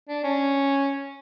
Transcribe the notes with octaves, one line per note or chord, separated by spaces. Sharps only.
D4
C#4